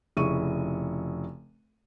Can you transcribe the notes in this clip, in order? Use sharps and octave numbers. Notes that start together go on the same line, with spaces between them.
F1 C#3 E4 C#6 D#7